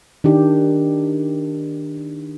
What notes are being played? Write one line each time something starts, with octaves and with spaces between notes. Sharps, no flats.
D#3 D4 G4